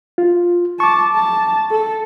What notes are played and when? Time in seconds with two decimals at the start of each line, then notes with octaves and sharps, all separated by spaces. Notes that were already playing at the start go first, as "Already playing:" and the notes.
0.18 F4
0.80 A5 C#6 D6
1.14 A5
1.71 A4